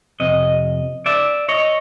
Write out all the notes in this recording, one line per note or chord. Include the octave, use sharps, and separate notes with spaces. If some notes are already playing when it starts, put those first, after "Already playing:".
F2 C3 D#5
D5 E5
C#5 D#5